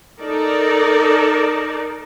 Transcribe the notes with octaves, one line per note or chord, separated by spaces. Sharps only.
D#4 A4 A#4 D5